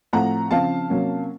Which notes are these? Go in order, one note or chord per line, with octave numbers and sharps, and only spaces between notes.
A2 F3 A3 C4 F#5 A#5
C#3 F3 C4 F5 A5
C3 F#3 A#3 C#4